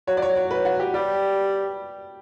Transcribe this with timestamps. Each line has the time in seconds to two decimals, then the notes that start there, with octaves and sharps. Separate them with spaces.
0.07 F#3 C#5
0.17 D5
0.22 C#5
0.37 C#5
0.51 B4
0.65 F#4
0.80 G4
0.94 G3 G4